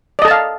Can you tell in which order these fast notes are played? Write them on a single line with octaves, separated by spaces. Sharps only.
D5 D#5 A4 A5 F5